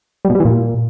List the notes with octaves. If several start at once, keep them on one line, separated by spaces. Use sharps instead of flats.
G3
B2
G3
E3
A#2